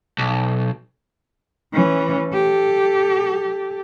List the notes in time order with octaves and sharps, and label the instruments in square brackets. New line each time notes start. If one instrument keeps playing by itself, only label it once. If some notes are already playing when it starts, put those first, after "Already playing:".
[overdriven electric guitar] B1
[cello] E3 C#4
G4 A4